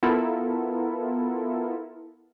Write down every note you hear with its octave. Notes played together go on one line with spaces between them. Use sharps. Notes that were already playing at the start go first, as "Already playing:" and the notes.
B3 E4 F4 A4 A#4